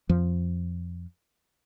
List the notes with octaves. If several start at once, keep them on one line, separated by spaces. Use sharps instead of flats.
F2 F3